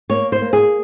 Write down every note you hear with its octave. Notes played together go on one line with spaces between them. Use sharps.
A#3 C#5
C5
A#3
G#4